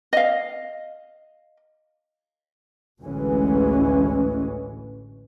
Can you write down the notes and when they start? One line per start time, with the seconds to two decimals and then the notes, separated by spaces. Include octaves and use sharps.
0.13 D#5 F5
3.03 A1 D2 E3 G#3 C#4